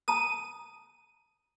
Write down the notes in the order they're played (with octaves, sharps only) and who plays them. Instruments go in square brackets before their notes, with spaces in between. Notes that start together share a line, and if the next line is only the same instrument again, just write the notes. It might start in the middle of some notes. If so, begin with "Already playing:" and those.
[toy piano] A5 A#5 D#6 [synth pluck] D#7